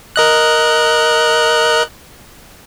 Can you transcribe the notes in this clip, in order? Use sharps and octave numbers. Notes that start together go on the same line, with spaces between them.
A#4 D#5 F#6